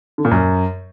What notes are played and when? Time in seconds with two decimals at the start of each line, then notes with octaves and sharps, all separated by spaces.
0.18 D3
0.25 A#2
0.31 F#2